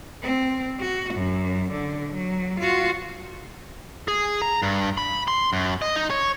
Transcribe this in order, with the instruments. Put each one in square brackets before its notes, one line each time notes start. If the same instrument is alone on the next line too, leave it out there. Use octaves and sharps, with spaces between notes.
[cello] C4
F#4
F#2
D3
F#3
F4 F#4
[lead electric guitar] G#4
A#5
G2
B5
C6
F#2
D#5
D#4
C#5